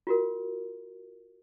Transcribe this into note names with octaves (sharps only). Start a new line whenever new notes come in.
F4 F#4 A#4